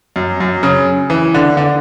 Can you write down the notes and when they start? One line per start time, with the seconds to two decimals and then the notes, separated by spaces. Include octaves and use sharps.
0.16 F#2
0.40 F#2
0.63 C#3
1.10 E3
1.34 D3
1.57 D3